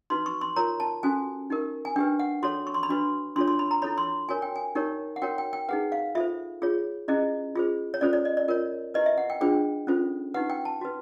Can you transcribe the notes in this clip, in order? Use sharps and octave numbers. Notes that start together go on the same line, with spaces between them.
D#4 F#4 B4 C6
C#6
C6
F4 A#4 C#5 A#5
A5
C#4 F#4 A4 G#5
D#4 G4 A#4
G#5
D4 G4 B4 G5
F#5
F#4 A4 C#5 C6
C#6
C6
B5
D4 F#4 B4 C6
D4 F4 A4 C#5 C6
C6
B5
A#5
E4 A4 C#5 B5
C6
F#4 A#4 C#5 G#5
G5
G#5
D#4 G4 A#4 C#5
F#5
F#4 A#4 C#5 G5
G5
G5
D#4 G#4 B4 F#5
F5
F4 A4 C5 E5
F4 G#4 C#5
C#4 E4 G#4 D#5
F4 G#4 C5
C#5
C#4 F4 A4 C5 D5
D5
D#5
D5
F4 A#4 C#5
E4 G4 B4 D#5
E5
F#5
G5
D4 F4 G#4 C5 G5
C#4 F4 A4 C5
D#4 G4 B4 F#5
G5
A5
F#4 B4